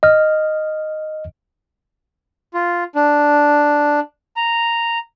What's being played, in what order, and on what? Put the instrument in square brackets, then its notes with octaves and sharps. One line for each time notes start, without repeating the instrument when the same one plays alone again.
[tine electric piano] D#5 F6
[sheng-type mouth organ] F4
D4
A#5